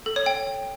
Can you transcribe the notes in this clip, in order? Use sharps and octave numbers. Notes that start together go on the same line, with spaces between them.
A4
C#5
G5